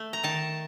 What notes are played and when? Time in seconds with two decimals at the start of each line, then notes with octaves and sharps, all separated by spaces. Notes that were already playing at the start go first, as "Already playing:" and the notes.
Already playing: A3
0.13 A#5
0.23 D#3 A5